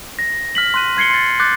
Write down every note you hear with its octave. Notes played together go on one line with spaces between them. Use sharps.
A#6
F6 B6 F#7
C6 F#6 D#7
C6 G#6 C7 C#7 G7
C6 A6
D6 F#6 G6 A6